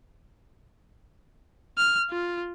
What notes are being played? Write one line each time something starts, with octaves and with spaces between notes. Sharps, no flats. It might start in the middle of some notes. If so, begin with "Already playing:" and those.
F6
F4